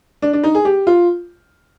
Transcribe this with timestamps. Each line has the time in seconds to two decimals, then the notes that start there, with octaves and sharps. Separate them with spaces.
0.22 D4
0.33 D4
0.44 D#4
0.55 G#4
0.65 G4
0.87 F4